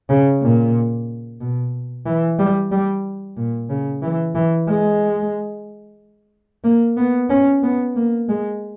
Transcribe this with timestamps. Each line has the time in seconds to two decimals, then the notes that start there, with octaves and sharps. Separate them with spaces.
0.09 C#3
0.42 A#2
1.41 B2
2.06 E3
2.39 G3
2.71 G3
3.37 A#2
3.70 C#3
4.02 E3
4.35 E3
4.68 G#3
6.64 A#3
6.97 B3
7.30 C#4
7.63 B3
7.96 A#3
8.29 G#3